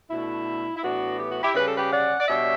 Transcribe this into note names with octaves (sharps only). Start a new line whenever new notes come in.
B2 A3 D4 E4
E4
A2 E3 B3 D4 F#4
G4
F#4
E4 G4
C#3 G3 C#4 B4
A4
G4 B4
D5 F#5
D5
B2 G3 D4 C#5 E5